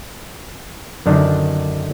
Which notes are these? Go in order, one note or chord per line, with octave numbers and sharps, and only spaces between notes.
F#2 D3 D#3 D4